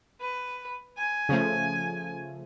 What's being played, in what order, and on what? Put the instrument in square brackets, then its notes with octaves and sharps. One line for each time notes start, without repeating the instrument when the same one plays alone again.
[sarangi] B4
G#5
[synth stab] C#3 F3 A3